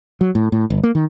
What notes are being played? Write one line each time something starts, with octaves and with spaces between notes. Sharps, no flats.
F#3
A2
A2
G1
A#3
D#3